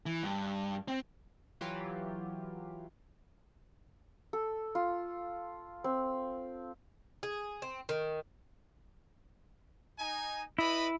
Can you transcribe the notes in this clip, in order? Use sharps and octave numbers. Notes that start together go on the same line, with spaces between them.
E3
G2
C4
E3 F#3 F4 G4
A4
F4
C4
G#4
C4
D#3
D#4 G#5
E4 B4 D#5 B5